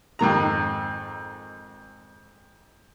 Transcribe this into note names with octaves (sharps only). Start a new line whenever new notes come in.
F2 G#2 D#3 A#5